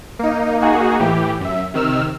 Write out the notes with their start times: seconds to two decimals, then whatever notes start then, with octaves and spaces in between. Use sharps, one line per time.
0.19 A#3 D#4
0.61 A#3 D#4 F#4 G#4
1.00 A2 E3 G4
1.40 F#2 E5
1.74 C3 D#3 E6 F6